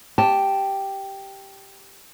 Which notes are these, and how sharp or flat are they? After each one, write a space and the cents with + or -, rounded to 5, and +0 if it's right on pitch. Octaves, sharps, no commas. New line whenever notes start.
G4 +0 A5 +0